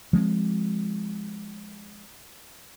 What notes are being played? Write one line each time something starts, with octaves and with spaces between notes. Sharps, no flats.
F3 G#3 A3 C4